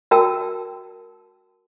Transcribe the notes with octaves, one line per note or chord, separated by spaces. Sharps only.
F#4 A#4 G5 A5 E6